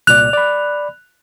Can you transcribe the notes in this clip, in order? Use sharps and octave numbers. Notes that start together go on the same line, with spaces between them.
C2 A#2 D5 F#6 F7
D5 B5